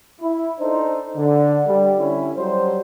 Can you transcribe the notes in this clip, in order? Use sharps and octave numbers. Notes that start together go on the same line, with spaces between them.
E4
D4 D#4 A4 C5
D3
G3
D3 C#4 E4
F#3 G3 C5